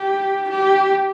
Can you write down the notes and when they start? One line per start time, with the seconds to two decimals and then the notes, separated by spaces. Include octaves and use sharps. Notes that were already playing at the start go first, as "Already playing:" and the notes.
Already playing: G4
0.50 G4